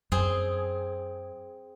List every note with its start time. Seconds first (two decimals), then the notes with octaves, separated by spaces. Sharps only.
0.12 F#2 C4 G#4